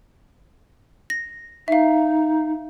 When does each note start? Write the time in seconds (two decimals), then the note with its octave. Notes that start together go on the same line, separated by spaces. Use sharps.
1.10 A#6
1.68 D#4 E5 F5